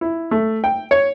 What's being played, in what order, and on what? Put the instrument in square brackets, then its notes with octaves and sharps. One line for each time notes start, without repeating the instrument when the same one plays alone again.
[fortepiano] E4
A3
G5
C#5